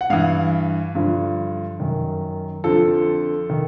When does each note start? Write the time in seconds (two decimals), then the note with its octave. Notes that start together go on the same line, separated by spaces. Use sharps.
0.01 F#5
0.10 G2 E3 F5
0.95 G2 D3 F3
1.80 F#2 D#3
2.64 F2 D3 F3 A4
3.50 D#3